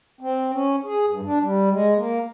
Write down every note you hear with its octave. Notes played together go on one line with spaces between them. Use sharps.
C4
C#4
G#4
G2
D4
G3
G#3
A#3